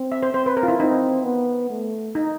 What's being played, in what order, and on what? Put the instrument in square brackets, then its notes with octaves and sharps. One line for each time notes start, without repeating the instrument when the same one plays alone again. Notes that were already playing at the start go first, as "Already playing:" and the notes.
Already playing: [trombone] C4
[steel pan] E5
C5
[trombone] C4 [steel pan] C5
[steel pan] B4
A#4
F4
E4
[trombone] C4 [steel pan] D#4
[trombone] B3
A3
[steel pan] D#4